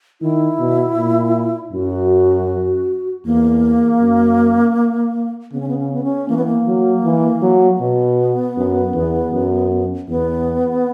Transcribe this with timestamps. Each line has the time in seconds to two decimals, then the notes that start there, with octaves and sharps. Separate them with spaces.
0.21 D#3 E4
0.59 B2
0.97 A#2
1.73 F#2 F#4
3.25 E2 A#3
4.00 F#2
5.53 C#3 B3
5.60 C#4
5.68 B3
5.79 C#4
5.93 B3
6.03 C#4
6.28 E3 A#3
6.37 B3
6.45 A#3
6.67 F#3
7.04 E3
7.42 F#3
7.75 A#3
7.80 B2 B3
8.57 F#2
8.94 E2
9.32 F#2
10.08 E2 B3